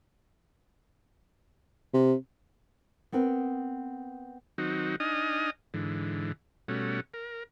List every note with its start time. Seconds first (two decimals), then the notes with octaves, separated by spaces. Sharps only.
1.94 C3
3.12 B3 C4 A#4 B4
4.58 D#3 F#3 C4 D#4 F#4
5.00 D4 D#4 D#5 G#5 D#6 F6
5.74 G#2 D3 E3
6.68 B2 G3 A3 C#4 F#4
7.14 A#4